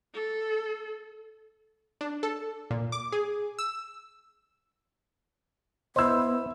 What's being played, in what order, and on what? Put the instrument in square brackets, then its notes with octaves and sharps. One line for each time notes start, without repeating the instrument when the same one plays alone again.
[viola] A4
[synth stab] D4
A4
A#2
D6
G#4
E6
[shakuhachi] B3 [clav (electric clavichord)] E4 C5 [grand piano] D#5 E6